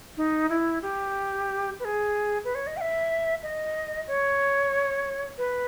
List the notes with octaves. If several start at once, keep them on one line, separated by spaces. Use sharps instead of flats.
D#4
E4
G4
B4
G#4
B4
C#5
D#5
G5
E5
D#5
C#5
B4